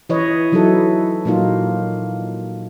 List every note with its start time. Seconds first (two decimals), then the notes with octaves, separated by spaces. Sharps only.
0.09 E3 B4 C#5 D#5
0.52 E3 F#3 D#4 E4 A4
1.25 A#2 F#3 A#3 D#4 F4